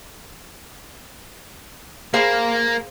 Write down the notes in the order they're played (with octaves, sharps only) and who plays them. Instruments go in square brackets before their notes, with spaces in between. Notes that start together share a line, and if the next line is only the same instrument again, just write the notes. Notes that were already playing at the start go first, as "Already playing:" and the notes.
[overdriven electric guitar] A#3 [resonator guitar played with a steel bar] G#4 C5 F5